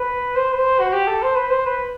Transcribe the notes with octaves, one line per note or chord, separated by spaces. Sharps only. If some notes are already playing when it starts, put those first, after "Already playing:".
Already playing: B4
C5
B4
C5
F#4
G4
A4
C5
B4
C5
B4